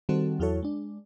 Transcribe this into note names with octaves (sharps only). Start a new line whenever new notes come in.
D#3 G3 C4 F#4 A4
E2 F#3 E4 F#4 A4 C#5
G#3 D4